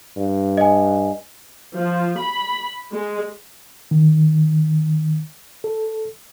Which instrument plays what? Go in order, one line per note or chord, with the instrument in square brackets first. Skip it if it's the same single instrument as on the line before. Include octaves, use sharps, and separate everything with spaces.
[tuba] G2
[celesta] D#5 G#5
[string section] F3
B5
G#3
[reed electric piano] D#3
A4